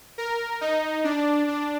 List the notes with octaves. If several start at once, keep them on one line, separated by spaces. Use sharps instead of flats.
A#4
D#4
D4
D4